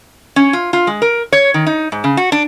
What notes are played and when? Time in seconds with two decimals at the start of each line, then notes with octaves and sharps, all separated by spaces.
0.36 C#4
0.53 F4
0.73 F4
0.87 G#3
1.02 A#4
1.32 C#5
1.54 D#3
1.66 D#4
1.92 G#2
2.04 C#3
2.17 F#4
2.32 D4